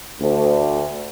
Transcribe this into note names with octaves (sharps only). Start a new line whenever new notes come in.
D2